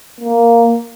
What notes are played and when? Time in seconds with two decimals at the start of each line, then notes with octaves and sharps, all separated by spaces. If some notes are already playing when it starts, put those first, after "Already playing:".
0.20 A#3